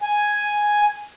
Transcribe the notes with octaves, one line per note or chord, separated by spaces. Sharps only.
G#5